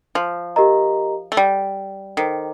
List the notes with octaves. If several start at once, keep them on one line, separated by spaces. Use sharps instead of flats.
F3
G4 A#4 D#5 A#5
A3
G3
D#3 A4 C5 G5 A#5 D6